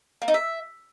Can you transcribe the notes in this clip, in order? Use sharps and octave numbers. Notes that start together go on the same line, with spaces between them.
A#3
D#4
E5